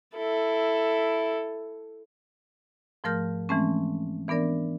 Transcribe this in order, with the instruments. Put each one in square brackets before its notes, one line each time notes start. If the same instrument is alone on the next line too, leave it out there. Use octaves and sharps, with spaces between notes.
[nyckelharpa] E4 A4
[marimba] G#2 F3 A3 A#4 F6 G6
E3 G#3 A3 C4 C#4
E3 B3 D4 A#4 D5